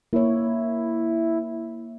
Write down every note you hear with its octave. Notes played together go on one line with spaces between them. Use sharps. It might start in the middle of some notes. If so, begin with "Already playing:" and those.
A#3 E4 C#5